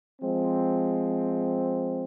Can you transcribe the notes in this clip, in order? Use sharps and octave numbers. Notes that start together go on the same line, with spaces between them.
F3 G#3 C4